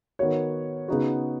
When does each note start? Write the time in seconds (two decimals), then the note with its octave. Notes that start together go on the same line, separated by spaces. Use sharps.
0.19 D#3 B3 F#4 C#5
0.88 C#3 B3 D#4 F#4